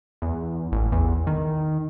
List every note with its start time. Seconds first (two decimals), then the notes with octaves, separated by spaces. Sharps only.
0.22 E2
0.72 A1
0.92 E2
1.27 D#3